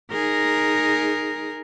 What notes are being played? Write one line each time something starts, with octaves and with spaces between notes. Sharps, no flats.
D#4 G#4 A#4